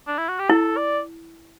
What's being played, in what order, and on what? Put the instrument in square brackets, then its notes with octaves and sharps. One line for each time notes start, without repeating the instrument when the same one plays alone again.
[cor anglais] D4
E4
F#4
G4
[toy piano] E4 [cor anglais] A4
[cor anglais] D5